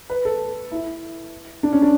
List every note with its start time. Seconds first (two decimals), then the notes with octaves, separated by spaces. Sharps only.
0.10 B4
0.25 A4
0.72 E4
1.63 D4
1.73 C#4
1.82 D4